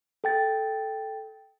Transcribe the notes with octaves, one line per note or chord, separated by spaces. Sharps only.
A4 G5 A6